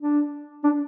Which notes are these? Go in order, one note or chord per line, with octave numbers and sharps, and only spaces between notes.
D4
D4